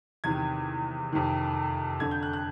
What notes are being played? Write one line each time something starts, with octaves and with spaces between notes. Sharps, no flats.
E2 C3 D#3 G#6
F2 C3 D#3
F2 D3 G#6
G6
F#6
F#6